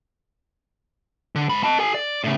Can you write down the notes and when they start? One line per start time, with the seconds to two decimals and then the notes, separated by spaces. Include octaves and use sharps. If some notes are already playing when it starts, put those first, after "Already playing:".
1.35 D3
1.49 G#2 B5
1.63 D#5 A5
1.79 A4 G#5
1.94 D5
2.24 A2 C#3